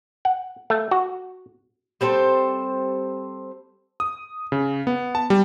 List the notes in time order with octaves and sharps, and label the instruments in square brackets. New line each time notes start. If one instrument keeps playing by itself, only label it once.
[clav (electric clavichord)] F#5
A3
F#4
[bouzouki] G3 C4 A4 C5
[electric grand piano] D#6
C#3
B3
A5
G3